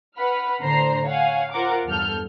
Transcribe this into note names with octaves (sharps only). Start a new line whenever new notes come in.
B4 F#5 B5 F6
A2 D3 D4 C5 A#5 C7
C#5 F5 F#5 G#5
F4 A#4 C5 F#5 D6
E2 G2 A4 F6 G6